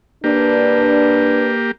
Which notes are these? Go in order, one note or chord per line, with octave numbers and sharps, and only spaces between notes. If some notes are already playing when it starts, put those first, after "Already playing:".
A#3 D4 G4 B4